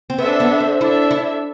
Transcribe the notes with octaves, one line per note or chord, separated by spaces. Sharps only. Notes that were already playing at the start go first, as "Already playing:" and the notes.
C4
B3 D4 A4 E5
B3
C4
D4 E4 A4 E5
E4